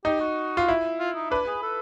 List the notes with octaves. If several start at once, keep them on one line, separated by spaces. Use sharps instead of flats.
D#4 G4
F#4
F4
E4
F4
D#4
D4 B4
G#4
A4